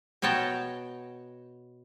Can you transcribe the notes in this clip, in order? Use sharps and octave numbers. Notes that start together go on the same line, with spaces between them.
B2 B3 C#5 G5 A5 A#5